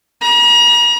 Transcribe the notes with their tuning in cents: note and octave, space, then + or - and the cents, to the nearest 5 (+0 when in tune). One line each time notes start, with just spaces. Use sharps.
A#5 +40